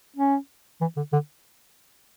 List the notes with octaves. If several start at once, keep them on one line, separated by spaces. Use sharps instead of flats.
C#4
E3
D3
D3